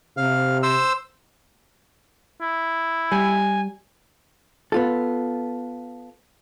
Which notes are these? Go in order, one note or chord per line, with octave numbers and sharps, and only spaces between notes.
C3 F5
C5 E6
E4
G3 G#5
B3 F4 A4